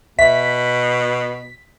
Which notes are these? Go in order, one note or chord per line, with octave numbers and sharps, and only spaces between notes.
B2 E5 B6